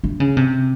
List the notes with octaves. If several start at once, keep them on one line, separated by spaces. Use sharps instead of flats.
D3
C#3
C3